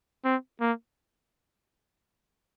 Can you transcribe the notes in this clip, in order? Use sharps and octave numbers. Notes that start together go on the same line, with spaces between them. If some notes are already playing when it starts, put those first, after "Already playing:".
C4
A#3